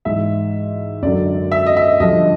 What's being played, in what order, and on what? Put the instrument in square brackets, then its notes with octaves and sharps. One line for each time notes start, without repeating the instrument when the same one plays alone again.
[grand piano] G#2 E3 E5
F#2 D3 F#3 D5
E5
D#5
E5
G2 D3 F3 D#5